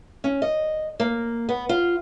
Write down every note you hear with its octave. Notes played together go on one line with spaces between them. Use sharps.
C#4
D#5
A#3
B3
F4